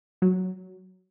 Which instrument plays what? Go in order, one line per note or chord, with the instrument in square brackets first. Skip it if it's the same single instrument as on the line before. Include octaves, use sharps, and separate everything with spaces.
[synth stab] F#3